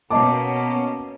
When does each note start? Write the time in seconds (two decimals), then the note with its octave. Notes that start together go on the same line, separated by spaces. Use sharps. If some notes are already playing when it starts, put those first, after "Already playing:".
0.10 B2 A#3 C#4 D#5 A5 D6